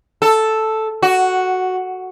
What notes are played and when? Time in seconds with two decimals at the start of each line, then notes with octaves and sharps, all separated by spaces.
0.22 A4
1.02 F#4